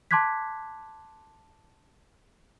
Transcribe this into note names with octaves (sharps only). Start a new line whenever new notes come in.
A5 C6 D6 F#6 G#6 B6